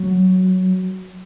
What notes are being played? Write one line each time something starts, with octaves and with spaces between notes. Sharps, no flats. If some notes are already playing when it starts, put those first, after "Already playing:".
Already playing: F#3